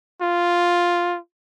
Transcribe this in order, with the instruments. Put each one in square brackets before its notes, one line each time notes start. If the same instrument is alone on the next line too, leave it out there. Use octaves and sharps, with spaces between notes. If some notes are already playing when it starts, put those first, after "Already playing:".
[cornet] F4